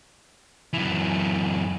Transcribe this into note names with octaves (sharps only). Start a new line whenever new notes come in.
F#2 E3